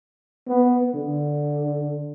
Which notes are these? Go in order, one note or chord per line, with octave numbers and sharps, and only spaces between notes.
B3
D3